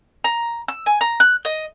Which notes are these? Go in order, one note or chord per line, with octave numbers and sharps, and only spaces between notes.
A#5
E6
G#5
A#5
F#6
D#5